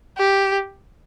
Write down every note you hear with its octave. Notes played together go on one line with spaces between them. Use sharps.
G4